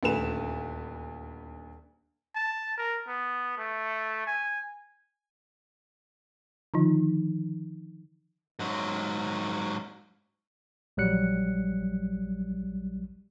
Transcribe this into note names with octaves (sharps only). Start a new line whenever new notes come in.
D#1 D2 B4 E7
A5
A#4
B3
A3
G#5
D3 D#3 F3 D#4
G#2 F#3
A#1 F#3 G3 F#6 C#7